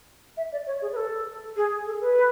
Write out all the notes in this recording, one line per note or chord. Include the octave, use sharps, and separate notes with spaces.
E5
D5
C#5
G#4
B4
A4
G#4
A4
B4